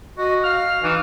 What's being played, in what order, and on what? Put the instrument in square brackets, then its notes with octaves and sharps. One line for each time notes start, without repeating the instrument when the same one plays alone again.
[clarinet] F#4 [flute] D#5
[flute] F5 [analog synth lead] F6
[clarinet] E3 [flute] D#4